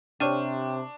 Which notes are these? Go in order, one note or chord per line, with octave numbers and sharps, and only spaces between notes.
C3 D4 C#5 G5 C#6 F6 D#7